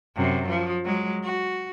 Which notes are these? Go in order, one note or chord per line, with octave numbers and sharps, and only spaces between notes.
F#2 C3
F3
F#3 G#3
F#4